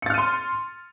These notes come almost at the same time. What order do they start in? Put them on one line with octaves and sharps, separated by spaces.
C#7 A6 F6 D#7 C6